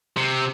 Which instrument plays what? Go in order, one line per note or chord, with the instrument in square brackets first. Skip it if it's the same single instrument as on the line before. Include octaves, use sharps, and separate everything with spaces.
[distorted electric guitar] C3